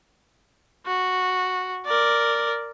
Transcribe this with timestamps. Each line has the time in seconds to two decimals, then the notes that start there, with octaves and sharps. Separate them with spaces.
0.87 F#4
1.86 A#4 D5